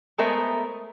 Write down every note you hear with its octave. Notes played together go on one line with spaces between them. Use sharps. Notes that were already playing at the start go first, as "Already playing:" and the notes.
G#3 A3 B3 A#4 C5 E5